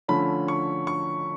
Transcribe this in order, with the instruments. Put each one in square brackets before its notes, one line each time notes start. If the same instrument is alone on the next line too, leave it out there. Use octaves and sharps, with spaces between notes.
[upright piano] D3 F3 A3 C#4 B5
C#6
C#6